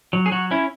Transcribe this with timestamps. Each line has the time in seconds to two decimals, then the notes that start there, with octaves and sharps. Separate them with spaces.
0.13 F#3
0.26 G#4
0.31 F#3 F#4
0.51 C#4 E4